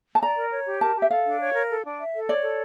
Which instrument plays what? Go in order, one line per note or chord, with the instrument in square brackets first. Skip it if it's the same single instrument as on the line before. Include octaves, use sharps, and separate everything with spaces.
[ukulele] A5
[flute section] D5 [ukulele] A#5
[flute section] A#4
C#5
G4
[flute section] A#4 [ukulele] A5
[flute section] G4
[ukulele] E5
[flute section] A4 [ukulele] F5
[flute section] D4
C#5
A#4
A4
D4
E5
A4
[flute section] C#5 [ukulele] D5
[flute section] A4